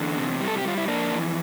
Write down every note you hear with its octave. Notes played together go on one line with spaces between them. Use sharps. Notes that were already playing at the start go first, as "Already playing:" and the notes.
Already playing: E2 D3
C3
G3
A4
G4
G3 F4
E4
F2 A#3 D4
E3